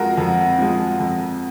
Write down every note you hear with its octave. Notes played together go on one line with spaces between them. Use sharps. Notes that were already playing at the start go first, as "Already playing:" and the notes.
Already playing: F2 F3 G#3 F#4 A#4
F2
F3 G#3
F2